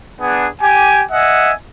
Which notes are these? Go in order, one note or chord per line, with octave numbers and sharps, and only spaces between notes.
B3 D4 G#4
G4 G#5
D#5 E5 F#5 G#5